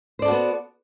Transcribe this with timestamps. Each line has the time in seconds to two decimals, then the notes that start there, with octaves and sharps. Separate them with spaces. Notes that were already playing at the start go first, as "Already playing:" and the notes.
0.19 C5
0.22 D5
0.25 A4
0.28 F#4
0.31 B3